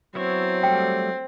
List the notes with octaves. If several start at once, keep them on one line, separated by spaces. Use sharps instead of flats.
F#3 B3 C4 E4 C#5
G3 A3 G5